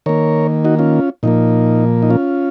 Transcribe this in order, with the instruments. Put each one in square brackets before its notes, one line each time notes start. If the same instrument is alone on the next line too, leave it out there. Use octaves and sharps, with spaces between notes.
[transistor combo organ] D#3 A#3 A#4 C#5
D#4 F#4
C#4 F4
A#2 F3 A#3 D#4
D#4
C#4 F4